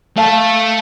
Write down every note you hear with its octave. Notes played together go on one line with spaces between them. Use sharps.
A3 A4 F5 A5